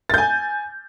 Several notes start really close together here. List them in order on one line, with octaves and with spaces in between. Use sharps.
A6 G6 G#5